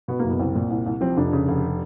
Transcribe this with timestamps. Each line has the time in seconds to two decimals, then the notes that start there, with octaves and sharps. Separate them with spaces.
0.08 B2 B3
0.19 F#1 A#3
0.30 B3
0.39 C2 C4
0.55 A#2
0.70 C2
0.86 C2
1.01 F3 C4
1.17 F1 D4
1.33 C#3
1.48 F1